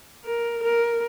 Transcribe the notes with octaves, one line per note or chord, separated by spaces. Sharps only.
A#4
A#4